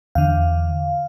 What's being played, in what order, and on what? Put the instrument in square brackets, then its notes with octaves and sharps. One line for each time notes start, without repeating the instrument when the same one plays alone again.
[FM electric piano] E2 D3 F5